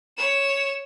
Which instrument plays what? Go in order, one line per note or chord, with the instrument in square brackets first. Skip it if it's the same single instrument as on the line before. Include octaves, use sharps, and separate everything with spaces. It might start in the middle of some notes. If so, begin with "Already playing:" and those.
[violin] C#5 E7